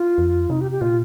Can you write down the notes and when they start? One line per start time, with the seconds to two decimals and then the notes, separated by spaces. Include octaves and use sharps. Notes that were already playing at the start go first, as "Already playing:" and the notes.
Already playing: F4
0.18 F2
0.50 C3 D#4
0.61 G4
0.71 G4
0.81 A#2 F4